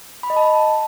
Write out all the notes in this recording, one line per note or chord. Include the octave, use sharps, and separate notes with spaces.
B5
D#5
A5